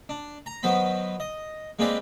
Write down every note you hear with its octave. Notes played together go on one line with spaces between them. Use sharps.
D4
A#5
D#3 F#3 B3 C5 B5
D#5
G#3 A#3 C4 G4 B4 D5